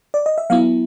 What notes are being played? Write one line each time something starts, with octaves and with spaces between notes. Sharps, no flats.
D5
D#5
E5
F#3 B3 E4 F5